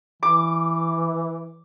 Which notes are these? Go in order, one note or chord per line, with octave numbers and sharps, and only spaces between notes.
E3 D6